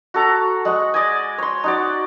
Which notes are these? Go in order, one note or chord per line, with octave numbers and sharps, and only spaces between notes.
F#4 A4 A#5
G#3 F#5 C#6
D5 D#5 G#5
C#5 C6
D#4 F#4 D5